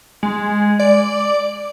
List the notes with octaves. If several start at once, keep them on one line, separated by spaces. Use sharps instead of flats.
G#3
D5